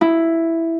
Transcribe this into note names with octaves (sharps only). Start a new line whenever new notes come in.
E4